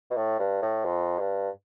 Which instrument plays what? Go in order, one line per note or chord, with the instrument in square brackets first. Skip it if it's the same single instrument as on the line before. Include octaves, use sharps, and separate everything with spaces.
[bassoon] B2
A2
G2
A2
F2
G2